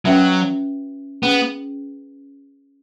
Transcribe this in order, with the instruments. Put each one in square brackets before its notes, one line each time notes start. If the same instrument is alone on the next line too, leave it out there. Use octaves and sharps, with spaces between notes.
[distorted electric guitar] F#3 [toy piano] C#4 F#4 B4 E5 B5
[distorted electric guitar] B3 [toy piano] C#4 G#4 B4